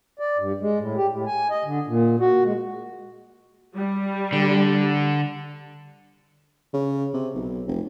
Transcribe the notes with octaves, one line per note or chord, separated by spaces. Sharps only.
D5
G2
G#3
A2
G4
A2
G#5
D#5
D3
A#2
F#4
G#3
G3
D3
C#3
C3
B1
F1